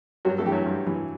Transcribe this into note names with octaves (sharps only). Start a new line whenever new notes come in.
G2 F#3 F#4
A3 A4
E3 G4
F#3 F#4
G2
E3